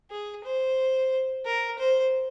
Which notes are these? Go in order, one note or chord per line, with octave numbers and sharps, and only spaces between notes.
G#4
C5
A#4
C5